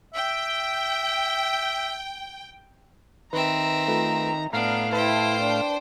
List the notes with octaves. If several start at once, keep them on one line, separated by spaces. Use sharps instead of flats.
E5 G5
D#3 C4 B4 E5 A#5
A3 F4 B4
A2 B3 D4 F5 A#5 F6 C7
E4 B4 C5 G5 A5
D4